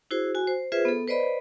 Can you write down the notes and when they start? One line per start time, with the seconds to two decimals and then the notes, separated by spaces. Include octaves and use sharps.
0.11 E4 F#4 G#4 C5
0.35 F#4 G#5
0.47 C5
0.72 F4 G#4 B4 C5 E5
0.85 B3 A4
1.08 B4 C5 D5 D#5 B5